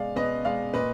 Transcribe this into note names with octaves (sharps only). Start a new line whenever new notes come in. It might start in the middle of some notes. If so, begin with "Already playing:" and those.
Already playing: B2 G#3 D5 F5
B2 B4 D#5
G#3 D5 F5
A#2 B4 D#5